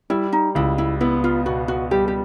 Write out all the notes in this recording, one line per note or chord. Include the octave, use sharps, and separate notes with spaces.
G3 E4
D#4
C#2 E4
E4
B3 E4
F4
B2 F#4
F#4
G3 G4
G4